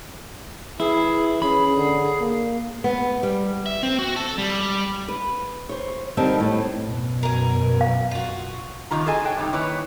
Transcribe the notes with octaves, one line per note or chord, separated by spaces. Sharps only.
E3 E4 G#4
C#4 G#4 B5
D3
A#3
B3
G3
E5
C4
F#4
A4
G3
B4
C5 C#5
D3 G3 C4 D#4 A#4 A5
A2
F#2 B2
A#4 G#5
F5
F4 F#4
F#2 C3 D#3 F4 A#5
F#4 G#4 A4 D#5 G#5
C#5 F#5 G5 A5
C3 G3 D4 D#4
D#3 A#3 E4 B4 C#5